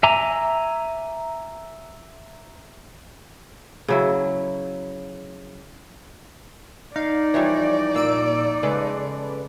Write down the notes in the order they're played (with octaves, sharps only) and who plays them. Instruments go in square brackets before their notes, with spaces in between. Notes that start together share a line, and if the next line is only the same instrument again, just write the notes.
[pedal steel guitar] E5 G#5 A#5 D6
[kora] C#3 F#3 E4
[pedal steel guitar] D#4 [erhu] D5 [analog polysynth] F5
[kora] E3 F3 G3 [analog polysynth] C#5
[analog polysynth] A#2 E6 D7 [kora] A#3
[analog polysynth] C#3 A4 B4 [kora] G#3